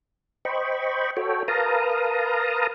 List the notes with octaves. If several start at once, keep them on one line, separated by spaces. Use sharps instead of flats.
C5 D#5 G5 B5 C#6
F#4 A4 C#5 G5
A#4 B4 F5 A5 A#5 D#6